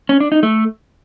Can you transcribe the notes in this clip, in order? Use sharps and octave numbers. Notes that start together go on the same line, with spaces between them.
C#4
D4
D#4
A3